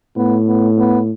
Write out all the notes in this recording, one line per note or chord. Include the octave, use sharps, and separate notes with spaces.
A2 B3
B3
B3